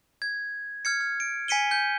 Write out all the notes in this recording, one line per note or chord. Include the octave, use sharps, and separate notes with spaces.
G#6
F6 G#6 C#7
F6
D7
G#5 B6 C#7 D#7 G7
G6